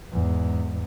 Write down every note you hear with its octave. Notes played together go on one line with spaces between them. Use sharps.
E2 G#2